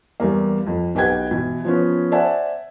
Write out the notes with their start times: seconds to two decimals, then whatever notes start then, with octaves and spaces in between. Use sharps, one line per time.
0.20 E2 G3 A#3
0.67 F2
0.95 B1 G4 B4 F#5 G5 G#6
1.31 B2 E3
1.65 F3 B3 C#4
2.12 C5 D5 E5 F#5 G#5 A5